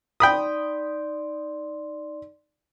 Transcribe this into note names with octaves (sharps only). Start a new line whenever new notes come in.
D#4 D5 G5 B5 C6 D#6